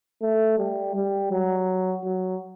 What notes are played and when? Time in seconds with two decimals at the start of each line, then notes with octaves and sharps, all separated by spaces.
0.22 A3
0.58 G3
0.95 G3
1.31 F#3
2.05 F#3